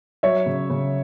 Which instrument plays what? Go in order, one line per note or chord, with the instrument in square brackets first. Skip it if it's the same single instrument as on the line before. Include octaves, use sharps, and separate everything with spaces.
[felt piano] F#3 [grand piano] C#5 E5
[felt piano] C#3
C#3